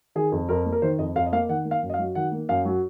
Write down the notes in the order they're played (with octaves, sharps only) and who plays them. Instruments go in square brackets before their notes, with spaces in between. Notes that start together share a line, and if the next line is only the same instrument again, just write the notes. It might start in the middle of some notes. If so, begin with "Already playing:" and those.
[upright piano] D#3 G#4
F2
F2 A#4
A#3
A#4
D#3 C5
F2 D#5
F2 F5
D#5
A#3 F5
D#3 F#5
A#3
F5
F#2
D#5
F5
F#3
D#3 F#5
A#3
F#2 F5
F#3